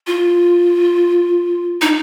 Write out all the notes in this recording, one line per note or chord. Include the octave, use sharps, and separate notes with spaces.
F4
D#4